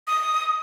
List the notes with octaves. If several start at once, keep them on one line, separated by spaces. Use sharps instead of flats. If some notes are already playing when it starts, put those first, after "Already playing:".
D#6